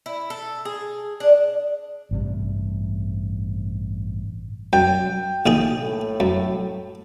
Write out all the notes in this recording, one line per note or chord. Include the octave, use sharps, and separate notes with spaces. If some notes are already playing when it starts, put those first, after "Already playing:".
E4
A4
G#4
D4
A1 G2 C3
F#2 G5
A#1 D#3 G#4
A2 A4
F#2